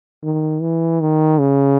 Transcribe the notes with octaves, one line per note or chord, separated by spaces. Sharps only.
D#3
E3
D#3
C#3